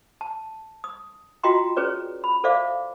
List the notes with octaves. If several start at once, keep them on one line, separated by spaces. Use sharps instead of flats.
A5
D#6
F4 F#4 D#5 G5 A#5 C6
C#4 G#4 B4 C#5 D5
B5
A4 C5 D5 E5 F5 D6